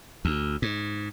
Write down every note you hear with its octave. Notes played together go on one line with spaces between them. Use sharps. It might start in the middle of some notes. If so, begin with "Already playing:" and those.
D2
G#2